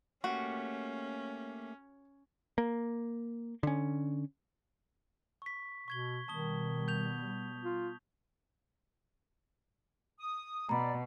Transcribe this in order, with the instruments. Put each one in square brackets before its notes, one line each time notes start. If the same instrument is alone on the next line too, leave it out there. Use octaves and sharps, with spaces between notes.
[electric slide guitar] A3 A#3 G4 [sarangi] C#4 [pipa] F#4
[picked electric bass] A#3
D3 C#4
[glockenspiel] C#6 B6
[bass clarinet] B2 [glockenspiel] C#6 G#6 G7
[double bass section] B2 G3 B3 [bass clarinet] D#3 [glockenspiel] A5 D#6 G7
[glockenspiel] G6 F7
[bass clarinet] F4
[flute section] D#6
[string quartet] B2 [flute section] D5 [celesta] A#5 B5